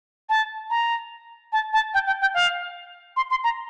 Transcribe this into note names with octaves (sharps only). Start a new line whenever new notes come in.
A5
A#5
A5
A5
G5
G5
G5
F5
C6
C6
A#5